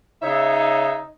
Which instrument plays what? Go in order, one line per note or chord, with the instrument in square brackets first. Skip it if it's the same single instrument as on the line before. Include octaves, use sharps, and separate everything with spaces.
[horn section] C#3 C#5 E5 [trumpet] D#4